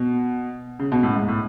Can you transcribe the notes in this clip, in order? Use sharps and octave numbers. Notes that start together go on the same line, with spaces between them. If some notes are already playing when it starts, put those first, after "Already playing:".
Already playing: B2
C#3
B2
A2
G#2
A2